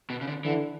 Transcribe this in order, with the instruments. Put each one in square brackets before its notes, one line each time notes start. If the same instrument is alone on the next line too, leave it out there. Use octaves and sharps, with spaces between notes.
[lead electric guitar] B2
C#3
D3
[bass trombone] D3 [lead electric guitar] E3